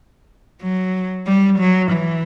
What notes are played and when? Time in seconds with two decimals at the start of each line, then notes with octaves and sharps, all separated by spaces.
0.62 F#3
1.27 G3
1.59 F#3
1.92 E3